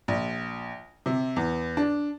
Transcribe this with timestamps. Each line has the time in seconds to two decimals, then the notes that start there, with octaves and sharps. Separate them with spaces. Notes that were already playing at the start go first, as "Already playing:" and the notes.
0.08 A#1
1.06 C3
1.36 E2
1.77 D4